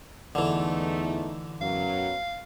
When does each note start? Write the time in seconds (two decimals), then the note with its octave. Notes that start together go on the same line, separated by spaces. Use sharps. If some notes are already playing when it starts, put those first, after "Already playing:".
0.35 E2 D3 E3 A3 D#4
1.61 F#2 B2 F#3 F5